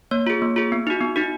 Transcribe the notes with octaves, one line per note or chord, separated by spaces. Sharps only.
A#3 C#5
F4 G#4
A#3
F4 G#4
B3
D#4 F#4
B3
D#4 F#4